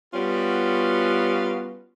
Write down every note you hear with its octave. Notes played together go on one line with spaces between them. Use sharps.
G3 B3 C#4 F4 F#4